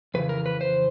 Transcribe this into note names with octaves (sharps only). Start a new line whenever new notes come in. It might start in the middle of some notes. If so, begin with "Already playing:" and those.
F2 C#3 E3 B4
A#4
B4
C5